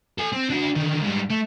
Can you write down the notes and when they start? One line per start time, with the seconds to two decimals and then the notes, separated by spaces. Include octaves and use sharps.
0.19 A4 G#5
0.33 C4
0.50 D4 F#4
0.76 D3 D#3
1.02 G#2 G3
1.30 A3